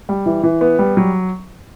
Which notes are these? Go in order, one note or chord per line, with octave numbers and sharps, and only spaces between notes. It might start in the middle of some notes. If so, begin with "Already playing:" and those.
G3
E3
E3
B3
G3
F#3